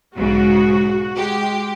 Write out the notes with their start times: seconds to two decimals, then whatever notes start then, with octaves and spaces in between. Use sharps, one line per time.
0.16 B1 G#2 C#3 F#4
1.15 G#3 G4